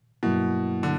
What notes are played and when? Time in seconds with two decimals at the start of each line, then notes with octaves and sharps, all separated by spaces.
0.23 G2 B2 F#3 A#3 E4
0.83 D3